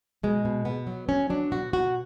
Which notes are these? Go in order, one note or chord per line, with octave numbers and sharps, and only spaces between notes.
B2 G#3
B2
B2 B3
F#3
F#3 C#4
F#3 D4
B2 F#4
B2 F#4